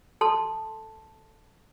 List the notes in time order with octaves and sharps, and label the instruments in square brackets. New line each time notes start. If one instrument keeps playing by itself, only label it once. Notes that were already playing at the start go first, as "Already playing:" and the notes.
[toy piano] A4 A5 C6